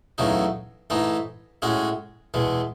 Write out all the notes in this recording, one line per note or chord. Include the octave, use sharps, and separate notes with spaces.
E2 C#3 F#3 A3 D#4
G#2 E3 A3 D#4
A2 G#3 C#4 F#4
E2 B2 G#3